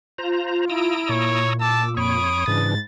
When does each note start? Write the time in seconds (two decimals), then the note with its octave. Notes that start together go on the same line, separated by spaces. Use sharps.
0.18 F4 C5 A#5
0.70 E4 A#5 D#6 E6 D7
1.09 A#2 C#5
1.60 A5 D6 E6
1.97 F2 C#5 B5 C#6 D#6 D7
2.48 G#2 C#3 E3 D4 A6